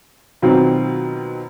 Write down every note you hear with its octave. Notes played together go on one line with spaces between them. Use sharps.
B2 D#3 F#3 C4 F4